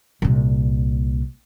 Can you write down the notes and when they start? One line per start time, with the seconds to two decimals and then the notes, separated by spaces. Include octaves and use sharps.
0.22 C2 A#2